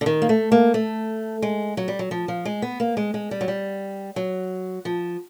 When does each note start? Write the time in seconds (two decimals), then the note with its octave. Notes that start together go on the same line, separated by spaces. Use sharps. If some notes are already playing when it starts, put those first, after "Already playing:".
0.01 D3
0.06 D#3
0.22 A#3
0.29 A3
0.52 A#3
0.74 A3
1.42 G#3
1.77 F#3
1.88 G3
1.99 F#3
2.11 F3
2.28 F3
2.45 G#3
2.62 B3
2.80 A#3
2.97 G#3
3.14 G#3
3.31 G3
3.41 F#3
3.48 G3
4.16 F#3
4.85 F3